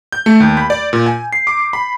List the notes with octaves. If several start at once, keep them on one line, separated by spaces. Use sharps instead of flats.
G6
A3
D#2
B5
D5
A#2
G#5
C7
D6
B5